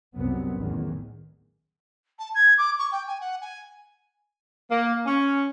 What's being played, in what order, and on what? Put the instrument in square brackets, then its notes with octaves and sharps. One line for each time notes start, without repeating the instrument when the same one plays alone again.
[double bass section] C2 F#2 C3 B3
A1 E2 D#3
[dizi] A5
G#6
D6
C#6
G5
G#5
F#5
G#5
[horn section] A#3
C#4